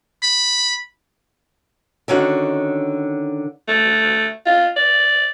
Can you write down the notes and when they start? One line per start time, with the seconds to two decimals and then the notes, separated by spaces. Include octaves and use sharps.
0.23 B5
2.08 D3 D#3 C#4 D#4 F#4
3.68 A3
4.46 F4
4.76 D5